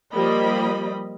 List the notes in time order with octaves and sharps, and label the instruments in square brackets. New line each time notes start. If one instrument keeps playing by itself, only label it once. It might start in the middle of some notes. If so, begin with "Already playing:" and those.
[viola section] F3 G3 A#3 D#5 B5